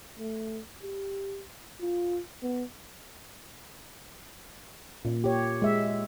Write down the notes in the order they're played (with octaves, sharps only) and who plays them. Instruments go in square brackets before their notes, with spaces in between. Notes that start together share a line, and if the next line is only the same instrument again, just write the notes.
[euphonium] A3
G4
F4
B3
[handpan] A#2
G4 C#5
G#3 E5